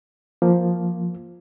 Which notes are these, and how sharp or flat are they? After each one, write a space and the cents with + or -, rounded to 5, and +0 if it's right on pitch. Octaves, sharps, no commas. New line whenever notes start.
F3 +0 A#3 +0